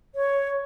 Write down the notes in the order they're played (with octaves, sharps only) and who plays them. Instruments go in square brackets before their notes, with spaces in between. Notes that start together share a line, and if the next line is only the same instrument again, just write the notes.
[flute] C#5